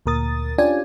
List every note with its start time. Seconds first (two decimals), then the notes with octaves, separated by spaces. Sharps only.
0.06 D2 A#2 A#4 D#6 A6
0.58 C#4 D4 F4 G4 D5 G#5